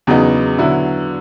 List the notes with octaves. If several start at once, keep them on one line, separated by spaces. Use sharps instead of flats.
E2 C#3 F#3 B3 D#4
D3 F#3 B3 E4